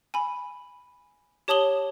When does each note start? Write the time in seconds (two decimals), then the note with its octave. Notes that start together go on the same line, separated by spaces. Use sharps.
0.14 G#5 B5
1.48 G4 C#5 A5 D#6 F#7 G7